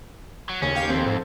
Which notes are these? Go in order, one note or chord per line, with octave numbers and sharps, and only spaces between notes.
F#3
D#2 C#3 C#4
G4 F5 G6
F2 C4 A4
G#2